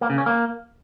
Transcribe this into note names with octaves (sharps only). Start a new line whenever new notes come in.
A#3
C#3
C#4
A#3